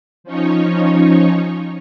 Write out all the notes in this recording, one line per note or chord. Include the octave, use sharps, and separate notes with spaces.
F3 C#4 D#4 C#5